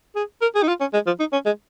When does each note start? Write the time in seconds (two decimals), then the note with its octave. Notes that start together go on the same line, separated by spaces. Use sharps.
0.16 G#4
0.42 A#4
0.55 G#4
0.63 D#4
0.68 F4
0.81 C#4
0.93 G#3
1.06 F3
1.19 D#4
1.33 C#4
1.46 G#3